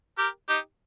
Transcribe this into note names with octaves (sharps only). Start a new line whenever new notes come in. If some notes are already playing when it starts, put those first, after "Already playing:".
G4 A#4
D#4 G4